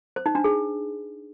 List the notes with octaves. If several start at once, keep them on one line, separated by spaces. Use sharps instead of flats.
C5
D#4
D4
G#4